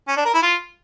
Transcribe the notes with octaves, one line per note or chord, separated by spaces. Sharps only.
C#4
D4
A#4
E4
F4